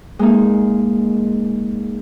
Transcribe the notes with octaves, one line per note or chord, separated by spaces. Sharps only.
G#3 A#3 D#4